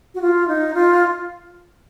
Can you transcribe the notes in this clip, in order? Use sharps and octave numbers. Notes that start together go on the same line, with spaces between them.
F#4
F4
D#4
F4